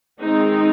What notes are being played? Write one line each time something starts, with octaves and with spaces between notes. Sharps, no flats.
D#3 G#3 C4 D#4